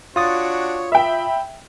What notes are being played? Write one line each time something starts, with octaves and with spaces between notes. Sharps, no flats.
D4 F4 F#4 C#5 D#6 A6
E5 G5 B5